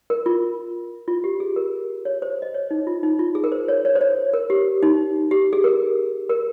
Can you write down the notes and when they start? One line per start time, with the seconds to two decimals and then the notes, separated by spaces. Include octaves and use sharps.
0.10 A#4
0.26 F4
1.08 F4
1.24 G4
1.40 G#4
1.56 A#4
2.05 C#5
2.22 C5
2.42 D#5
2.54 C#5
2.71 D#4
2.87 F4
3.03 D#4
3.19 F4
3.35 G#4
3.44 A#4
3.52 C5
3.68 C#5
3.85 C#5
3.95 C5
4.01 C#5
4.34 A#4
4.50 G4
4.83 D#4
5.31 G4
5.53 G#4
5.64 A#4
6.30 A#4